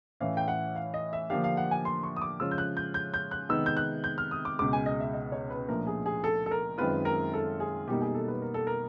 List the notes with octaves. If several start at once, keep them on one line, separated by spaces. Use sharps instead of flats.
A2 E3 A3 C#4 E4 F5
G5
F#5
F5
D#5
E5
D3 F3 A#3 D4 G4 F5
F5
F#5
G#5
C6
C#6
D#6
D6
C#3 F3 G#3 C#4 F4 E6
G6
F#6
G6
G6
G6
F#6
C3 D#3 G#3 B3 D#4 E6
G6
F#6
G6
F6
D#6
D6
C#2 B2 G#3 D6
G#5
D#5
E5
D#5
C#5
B4
A#2 F3 A3 D4 A#4
G#4
G#4
A4
A4
A#4
F#2 D#3 G#3 C4 F4 B4
A#4
A4
G#4
B2 G3 A#3 D#4 G4
G#4
A4
B4
A#4
A4
A#4